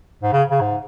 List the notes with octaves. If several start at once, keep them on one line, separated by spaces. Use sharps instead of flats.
G#2
C#3
C#3
G#2